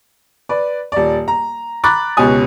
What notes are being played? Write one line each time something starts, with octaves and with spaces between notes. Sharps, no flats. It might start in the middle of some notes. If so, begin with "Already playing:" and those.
B4 D5
D#1 D5
A#5
A#5 B5 D6 F#6 A6
C#2 B2 C#4 G4 G#5 D#6